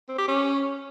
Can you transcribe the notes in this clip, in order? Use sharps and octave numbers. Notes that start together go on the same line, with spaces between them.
C4
G4
C#4